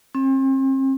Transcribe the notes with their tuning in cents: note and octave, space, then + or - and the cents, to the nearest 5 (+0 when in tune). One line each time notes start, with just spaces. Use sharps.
C4 +40